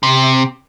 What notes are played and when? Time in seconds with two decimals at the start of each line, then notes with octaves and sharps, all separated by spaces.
0.03 C3